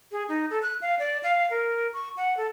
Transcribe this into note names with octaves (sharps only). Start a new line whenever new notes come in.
G#4
D#4
A4
F#6
F5
D5
F5
A#4
C#6
F#5
A4